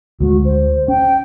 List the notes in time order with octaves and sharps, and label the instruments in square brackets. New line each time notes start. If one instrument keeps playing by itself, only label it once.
[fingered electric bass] D2 G#3 [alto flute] F#4
[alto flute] C5
[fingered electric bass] C#4 [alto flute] G5